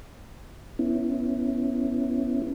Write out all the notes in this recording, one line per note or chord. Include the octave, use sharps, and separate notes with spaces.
B3 C#4 E4